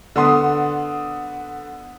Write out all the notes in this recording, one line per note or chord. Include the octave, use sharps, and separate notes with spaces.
D3 B3 C6 D#6